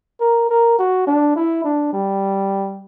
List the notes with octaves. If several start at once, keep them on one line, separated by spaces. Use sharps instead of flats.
A#4
A#4
F#4
D4
E4
D4
G3